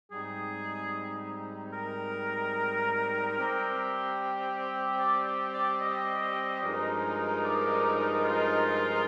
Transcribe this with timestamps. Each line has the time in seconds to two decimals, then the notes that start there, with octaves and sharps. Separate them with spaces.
0.11 G#2 G3 C4 D#4 G#4
1.73 A#4
3.36 G3 C4 G4
4.99 D5
5.53 D5
5.81 D#5
6.63 G2 F3 G#3 D#4 A#4
7.44 D5
8.24 F4